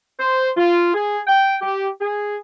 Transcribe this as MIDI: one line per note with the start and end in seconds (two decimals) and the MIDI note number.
0.19 0.50 72
0.56 0.89 65
0.94 1.19 68
1.27 1.56 79
1.61 1.88 67
2.01 2.37 68